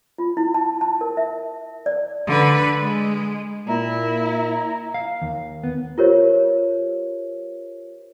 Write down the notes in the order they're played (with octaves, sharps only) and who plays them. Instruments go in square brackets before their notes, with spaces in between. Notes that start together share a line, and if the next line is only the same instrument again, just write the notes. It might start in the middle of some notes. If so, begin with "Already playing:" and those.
[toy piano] F4
E4
A5
A5
A#4
E5
D5
[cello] D3 B4
G#3
[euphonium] A#2 [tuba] A#3 [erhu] E4 [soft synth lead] A#5
[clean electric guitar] F5
D#2
B3
[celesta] F4 G4 A#4 C5 C#5